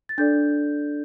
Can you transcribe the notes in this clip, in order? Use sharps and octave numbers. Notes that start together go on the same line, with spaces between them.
A6
D4 A4 D5 G6